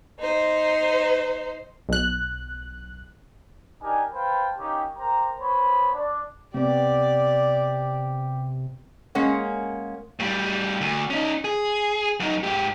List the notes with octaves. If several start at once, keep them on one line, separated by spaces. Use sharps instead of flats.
D#4 C5
B1 F#6
D4 D#4 G4 A#4 G#5
B4 C5 F5 G5 A5 B5
A#3 C#4 D#4 G4
G4 A#4 C5 A#5
B3 C5 C#5 B5
D4
C3 B3 C4 G4 D5
G#3 A#3 C#4 F#5
A2 G3
D2
C#4 D#4
G#4
F#2 D#4
G#2 G4